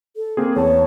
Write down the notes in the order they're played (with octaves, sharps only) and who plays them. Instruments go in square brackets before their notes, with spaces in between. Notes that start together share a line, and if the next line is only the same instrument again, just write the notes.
[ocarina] A4
[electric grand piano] A#3 C4 G#4
[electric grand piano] E2 A5 [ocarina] C#5